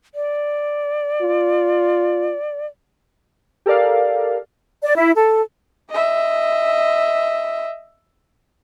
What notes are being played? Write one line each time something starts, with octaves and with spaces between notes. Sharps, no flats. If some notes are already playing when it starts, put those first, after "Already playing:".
D5
F4
G4 A4 A#4 D5 F5
D5
E4
A4
D#5 E5